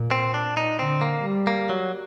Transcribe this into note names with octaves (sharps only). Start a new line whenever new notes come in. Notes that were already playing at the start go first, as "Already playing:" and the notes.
Already playing: A#2
C4
D4
D#4
D3 C4
A#3
G3
A#3
F#3